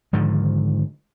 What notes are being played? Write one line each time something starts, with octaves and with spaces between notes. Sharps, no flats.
G#2 D3 D#3 F3